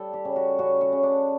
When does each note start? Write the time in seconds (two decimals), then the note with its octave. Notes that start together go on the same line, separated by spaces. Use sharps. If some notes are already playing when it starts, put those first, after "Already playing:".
Already playing: G3 A4
0.13 G4
0.25 C#3
0.36 F#4
0.59 C#3 F#4
0.81 F#4
0.92 C#3
1.03 D4